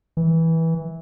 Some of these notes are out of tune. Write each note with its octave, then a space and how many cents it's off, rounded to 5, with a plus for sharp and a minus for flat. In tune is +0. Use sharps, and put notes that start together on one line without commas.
E3 -15